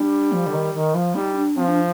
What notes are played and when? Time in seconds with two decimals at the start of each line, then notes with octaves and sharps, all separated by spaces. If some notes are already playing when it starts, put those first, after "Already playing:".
Already playing: G3 D4
0.32 F3
0.46 D3
0.53 D#3
0.74 D#3
0.94 F3
1.15 G3 D#4
1.36 D4
1.56 F3 C4
1.68 D4